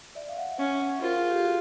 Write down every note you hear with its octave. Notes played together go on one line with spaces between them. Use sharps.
D5 E5
F5
E5 F#5
C#4 E5 F#5
E5 F#5
F4 A#4 C5
G#4 A#4
G4 A4
F#4 G#4